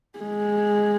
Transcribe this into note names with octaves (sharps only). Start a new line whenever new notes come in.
G#3